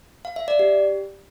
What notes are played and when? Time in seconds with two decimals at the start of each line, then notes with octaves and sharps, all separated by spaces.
0.25 F5
0.36 E5
0.48 D5
0.59 G4